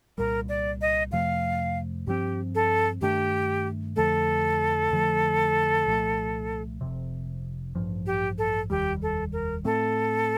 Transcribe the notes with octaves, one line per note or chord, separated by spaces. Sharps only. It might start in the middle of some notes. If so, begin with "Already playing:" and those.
C2 A#2 G3 A#4
D5
D#5
F2 C3 F3 A3 F5
G2 F3 C4 G4
A4
G2 D#3 A3 D4 G4
F2 D3 F3 A3 A4
F2 D3 F3 A3
C2 A#2 F3 A3
F1 F2 C3
A1 G2 F3
G4
A4
F1 D#2 D#3 G3 G4
A4
A#4
A2 A3 C4 A4